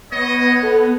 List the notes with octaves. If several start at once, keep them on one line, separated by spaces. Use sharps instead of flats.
B3 C#5 D#5
A4